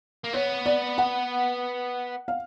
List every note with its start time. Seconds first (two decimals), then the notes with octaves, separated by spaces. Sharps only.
0.24 A#3
0.33 B3 C#5
0.66 D5
0.98 F#5
2.28 F5